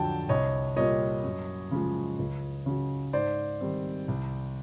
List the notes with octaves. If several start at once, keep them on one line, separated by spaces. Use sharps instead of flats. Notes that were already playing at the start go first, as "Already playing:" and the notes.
Already playing: F2 D3 F#3 G5 A5
C2 C#5 D#5
A#2 G3 A#3 C#5 D#5
F#2
C#3 F3 G#3
C#2
C#3 F#3
G#2 C5 D5
D#3 G3 C4
C2